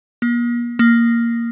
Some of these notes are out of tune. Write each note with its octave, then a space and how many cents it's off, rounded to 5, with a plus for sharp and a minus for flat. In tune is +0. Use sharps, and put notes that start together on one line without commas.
A#3 +40
A#3 +0